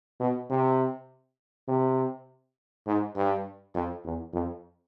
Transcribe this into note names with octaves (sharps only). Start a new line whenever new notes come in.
B2
C3
C3
G#2
G2
F2
E2
F2